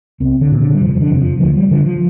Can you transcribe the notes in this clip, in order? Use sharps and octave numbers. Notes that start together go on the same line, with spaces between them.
C2 C4
D3
A#2
D3
G3
F1 F3
F3
D3
F2 C3
F3
D2 F3
G3
D3 F3
F3